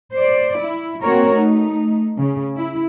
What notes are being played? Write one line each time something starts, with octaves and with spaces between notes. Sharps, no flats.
C5 D5
E4
A#3 C4 F#4 A#4 C#5
A3 D#4
C#3
E4